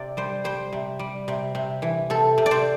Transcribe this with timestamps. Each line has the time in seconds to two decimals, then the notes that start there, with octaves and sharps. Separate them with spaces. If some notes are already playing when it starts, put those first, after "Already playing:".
Already playing: C3 D5
0.17 G3 C5
0.44 G3 C5
0.73 C3
0.99 G3
1.28 C3
1.55 C3
1.82 E3
2.10 C3 A4
2.38 C3
2.46 D5
2.51 C5